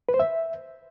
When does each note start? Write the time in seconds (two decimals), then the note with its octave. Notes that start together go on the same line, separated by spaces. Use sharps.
0.09 B4
0.14 C5
0.20 E5